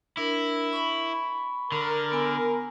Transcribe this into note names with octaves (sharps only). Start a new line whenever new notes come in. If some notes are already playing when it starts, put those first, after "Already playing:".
D4 E4 A#4
B5 C#6
D3 A#4
B3 G#5 E6